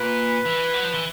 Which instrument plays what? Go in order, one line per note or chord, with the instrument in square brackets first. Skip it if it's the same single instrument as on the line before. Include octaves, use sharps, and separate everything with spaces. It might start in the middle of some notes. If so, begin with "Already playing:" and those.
Already playing: [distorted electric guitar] A#2 [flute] B4
[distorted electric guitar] E3
F#3
F3
E3